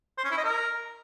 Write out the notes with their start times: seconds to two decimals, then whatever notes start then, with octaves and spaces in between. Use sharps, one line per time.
0.18 C5
0.24 C#4
0.31 E4
0.38 D#5
0.44 A#4